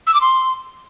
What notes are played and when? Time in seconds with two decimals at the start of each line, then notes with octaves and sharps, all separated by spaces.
0.07 E6
0.14 D6
0.21 C6